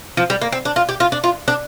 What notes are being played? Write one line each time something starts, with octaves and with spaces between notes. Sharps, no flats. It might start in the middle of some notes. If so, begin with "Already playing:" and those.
F3
G3
A#3
C4
D4
F4
G4
F4
D4
F4
D4